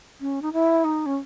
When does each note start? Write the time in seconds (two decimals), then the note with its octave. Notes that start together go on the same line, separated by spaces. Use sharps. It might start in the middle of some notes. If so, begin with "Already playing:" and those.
0.21 C#4
0.42 D#4
0.53 E4
0.84 D#4
1.06 C#4